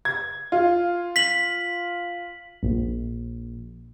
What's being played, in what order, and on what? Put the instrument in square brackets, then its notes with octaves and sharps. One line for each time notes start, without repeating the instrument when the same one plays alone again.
[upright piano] G#6
F4
[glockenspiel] B6 F#7
[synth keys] A#1